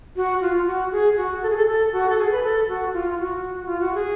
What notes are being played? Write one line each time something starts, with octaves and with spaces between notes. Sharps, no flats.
F#4
F4
F#4
G#4
F#4
A4
G#4
A4
A4
F#4
A4
G#4
B4
A4
F#4
F4
F4
F#4
F4
F#4
G#4